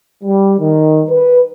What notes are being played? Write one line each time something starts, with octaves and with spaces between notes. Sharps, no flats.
G3
D#3
B4